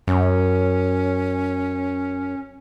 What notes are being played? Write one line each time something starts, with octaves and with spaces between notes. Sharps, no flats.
F#2 C#4